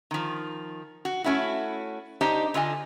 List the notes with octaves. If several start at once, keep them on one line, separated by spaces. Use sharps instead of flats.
D#3 F3
F#4
A3 C#4 E4 F#4
D4 D#4 G4 C5 D#5
D3 F4 D#5 G#5